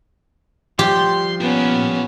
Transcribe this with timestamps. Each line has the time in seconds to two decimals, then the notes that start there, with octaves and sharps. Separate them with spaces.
0.79 F3 G3 G4 C6
1.41 B3 C#4 F4 A#4